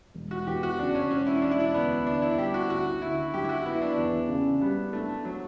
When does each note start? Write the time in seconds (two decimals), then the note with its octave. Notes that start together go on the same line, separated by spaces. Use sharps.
0.15 E1
0.31 F#4
0.47 E2 G4
0.63 F#4
0.79 C#3 D4
0.95 C#4
1.10 E1 C#4
1.26 E4
1.42 E1 D4
1.51 E4
1.60 D4
1.74 D2 B3
2.06 D3 D4
2.22 E4
2.38 G3 G4
2.54 F#4
2.70 D2 F#4
3.02 D3 E4
3.34 F#3 G4
3.44 E4
3.49 F#4
3.65 B3 E4
3.82 D4
3.97 E2
4.29 C#3
4.61 G3 B3
4.92 A3 D4
5.25 F#3